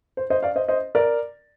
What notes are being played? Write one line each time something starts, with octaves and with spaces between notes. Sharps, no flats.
C5
C5 D#5
D5 F5
C5 D#5
C5 D#5
A#4 D5